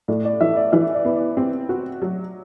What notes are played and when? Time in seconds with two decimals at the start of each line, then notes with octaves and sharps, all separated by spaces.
0.08 A2 D5
0.25 D5
0.41 E3 E5
0.56 D5
0.72 E3 E5
0.94 D5
1.05 B3
1.15 D5
1.37 C4
1.69 F#4
2.02 F#3